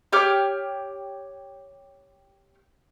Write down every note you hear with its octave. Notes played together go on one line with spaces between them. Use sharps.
G4 C#5 D6 F6